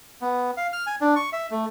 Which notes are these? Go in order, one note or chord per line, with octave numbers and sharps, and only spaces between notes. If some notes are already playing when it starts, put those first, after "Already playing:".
B3
F5
F6
G#5
D4
C#6
E5
A3